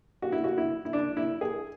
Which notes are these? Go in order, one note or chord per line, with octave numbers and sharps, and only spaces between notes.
F#4
E4
F#4
E4
E4
D4
E4
G#4